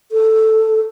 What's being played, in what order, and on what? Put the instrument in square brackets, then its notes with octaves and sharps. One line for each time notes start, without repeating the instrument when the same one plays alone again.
[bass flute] A4